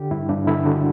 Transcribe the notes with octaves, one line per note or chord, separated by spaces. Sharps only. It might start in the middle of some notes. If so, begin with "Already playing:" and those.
Already playing: D3 G4
G2 E4
G2 D4
D3 E4
D3 F#4